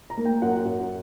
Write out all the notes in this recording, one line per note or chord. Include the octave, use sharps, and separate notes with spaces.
A#5
A#3
G5
F#2 F#5
F#2